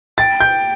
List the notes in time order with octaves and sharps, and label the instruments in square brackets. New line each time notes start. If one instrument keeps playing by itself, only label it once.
[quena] G5 [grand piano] A6
[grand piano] G6